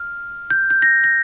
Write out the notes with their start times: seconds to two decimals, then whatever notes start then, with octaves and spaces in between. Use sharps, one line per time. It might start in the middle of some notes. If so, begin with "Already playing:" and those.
Already playing: F6
0.51 G6
0.70 G6
0.82 A#6
1.04 A#6